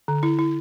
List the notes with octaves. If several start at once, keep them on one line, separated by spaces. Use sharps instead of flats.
D3
E4
E4